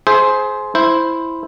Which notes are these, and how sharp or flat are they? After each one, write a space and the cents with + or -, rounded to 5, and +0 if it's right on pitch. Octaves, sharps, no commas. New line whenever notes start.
G#4 +25 C5 +0 E5 +0
E4 +0 C5 +0